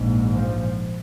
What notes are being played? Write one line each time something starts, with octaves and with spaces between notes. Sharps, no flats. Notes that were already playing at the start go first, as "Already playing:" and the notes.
Already playing: A#1 G#2
F3